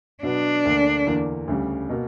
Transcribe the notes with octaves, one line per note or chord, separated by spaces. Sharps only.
B2 F#3 B3 D4
D2 D3 A#3
E2 D3 A#3
D2 C#3 G3
B2 A#3